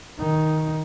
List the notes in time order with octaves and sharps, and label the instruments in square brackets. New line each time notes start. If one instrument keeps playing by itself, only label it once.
[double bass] D#3 D#4